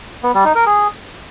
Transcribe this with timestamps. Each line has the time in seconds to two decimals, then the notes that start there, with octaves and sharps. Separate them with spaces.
0.23 B3
0.34 G3
0.45 D#4
0.55 A#4
0.66 G#4